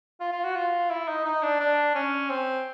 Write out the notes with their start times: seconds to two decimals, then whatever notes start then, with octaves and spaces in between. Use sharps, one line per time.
0.20 F4
0.32 F4
0.44 F#4
0.56 F4
0.90 E4
1.08 D#4
1.25 D#4
1.43 D4
1.60 D4
1.95 C#4
2.30 C4